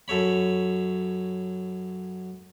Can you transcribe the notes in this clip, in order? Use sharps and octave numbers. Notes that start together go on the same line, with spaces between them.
F#2 A4 C#5 B5